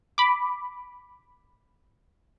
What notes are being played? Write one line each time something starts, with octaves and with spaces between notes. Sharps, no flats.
B5 D6